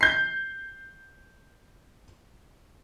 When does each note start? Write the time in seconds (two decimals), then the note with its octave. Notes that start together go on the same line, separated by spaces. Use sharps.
0.01 G6 C7